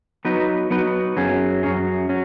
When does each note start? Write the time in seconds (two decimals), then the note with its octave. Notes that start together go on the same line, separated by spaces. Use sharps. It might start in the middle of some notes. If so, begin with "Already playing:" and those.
0.25 F#3 B3 D#4 B4
0.71 F#3 B3 D#4 B4
1.17 F#2 F#3 C#4 G#4
1.63 F#2 F#3 C#4 G#4
2.09 F#3 C#4